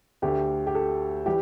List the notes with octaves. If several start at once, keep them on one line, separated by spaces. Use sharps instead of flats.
D2 D3 A3 G4
G4
A4
E3 G3 G4